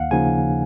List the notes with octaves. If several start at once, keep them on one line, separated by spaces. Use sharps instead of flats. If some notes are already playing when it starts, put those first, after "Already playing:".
Already playing: D#2 F5 F#5
C#3 F3 A#3 D#4 G#5